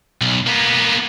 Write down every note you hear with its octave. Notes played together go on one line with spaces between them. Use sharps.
B1
A#3 B3